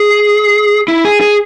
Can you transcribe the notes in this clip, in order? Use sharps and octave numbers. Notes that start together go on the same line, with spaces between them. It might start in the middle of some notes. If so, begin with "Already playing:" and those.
Already playing: G#4
E4
G#4
G#4